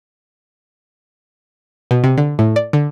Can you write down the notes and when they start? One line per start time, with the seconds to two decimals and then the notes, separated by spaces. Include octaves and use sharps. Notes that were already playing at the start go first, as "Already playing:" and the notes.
1.91 B2
2.04 C3
2.18 D3
2.39 A2
2.56 D5
2.73 D3